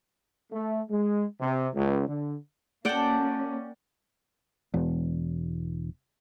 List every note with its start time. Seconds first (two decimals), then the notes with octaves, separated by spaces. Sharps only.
0.52 A3
0.90 G#3
1.41 C3
1.75 C#2
2.07 D3
2.85 A#3 C#4 F#4 A4 D5 F#5 G5
4.74 E1